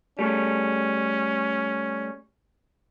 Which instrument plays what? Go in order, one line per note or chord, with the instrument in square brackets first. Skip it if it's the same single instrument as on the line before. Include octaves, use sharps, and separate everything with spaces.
[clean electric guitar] G3 A3 [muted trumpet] C#4